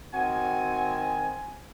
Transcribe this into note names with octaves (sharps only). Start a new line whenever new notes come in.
D#3 C4 F#4 G#5